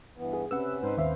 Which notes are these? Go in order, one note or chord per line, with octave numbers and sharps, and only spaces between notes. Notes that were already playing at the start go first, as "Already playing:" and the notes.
G2 E3 B3
G#4
C3 C4 C#4 B4 F#5 E6
G#2 D#4 B4 C5
D#2 D#3 B4 C5 E5 F5